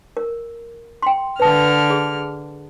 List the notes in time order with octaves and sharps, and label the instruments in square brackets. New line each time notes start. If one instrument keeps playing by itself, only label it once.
[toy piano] A#4
G5 C6
[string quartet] D3 F6 [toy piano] B4 A5
[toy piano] G#4